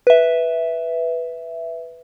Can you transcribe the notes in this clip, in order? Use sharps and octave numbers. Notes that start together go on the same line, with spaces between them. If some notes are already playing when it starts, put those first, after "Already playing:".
B4 E5